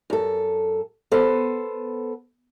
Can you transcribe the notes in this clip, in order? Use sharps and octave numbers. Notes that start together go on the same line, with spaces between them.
F#2 A4
B3 A4 C5